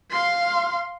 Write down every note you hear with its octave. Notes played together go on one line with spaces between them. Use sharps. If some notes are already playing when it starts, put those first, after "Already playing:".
F5 C6